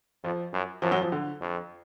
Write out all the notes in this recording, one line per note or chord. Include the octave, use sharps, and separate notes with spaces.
F2 F3
F#2
F#2 F3
F#3
F3
D3
F2